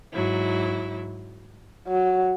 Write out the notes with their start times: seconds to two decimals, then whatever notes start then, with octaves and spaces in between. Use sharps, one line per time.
0.13 G#2 F#3 E4
1.87 F#3